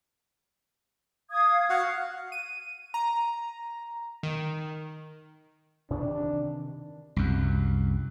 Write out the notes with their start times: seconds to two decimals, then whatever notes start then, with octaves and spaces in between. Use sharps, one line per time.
1.30 F5 D#6 G#6
1.70 F#4 F5 F#5
2.32 D#7
2.94 A#5
4.23 D#3
5.91 C3 D#3 E3 D4
7.16 C2 F#2